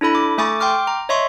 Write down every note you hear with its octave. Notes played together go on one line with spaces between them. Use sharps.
D4 E4 A4 B5
D6
A3 A4 G#5 C#6 D6 A6
G5 C6 D6 F6
A#5
C#5 D#5 E5 C6 C#6